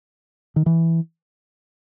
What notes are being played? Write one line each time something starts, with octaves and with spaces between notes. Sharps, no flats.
D#3
E3